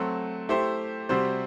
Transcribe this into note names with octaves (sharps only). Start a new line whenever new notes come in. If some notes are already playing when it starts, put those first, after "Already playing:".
Already playing: F#3 A3 C4
A3 E4 G4 C5
C3 G3 C4 F#4 C5